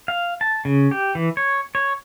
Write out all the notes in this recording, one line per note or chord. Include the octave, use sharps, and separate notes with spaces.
F5
A5
C#3
G4
E3
C#5
C#5